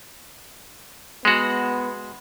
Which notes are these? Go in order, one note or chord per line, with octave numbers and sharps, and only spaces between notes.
G#3 B3 F#4